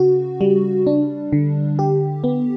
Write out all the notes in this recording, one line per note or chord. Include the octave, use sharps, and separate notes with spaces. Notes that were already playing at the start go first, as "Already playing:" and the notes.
Already playing: C#3 F#4
G3
D4
D3
G4
B3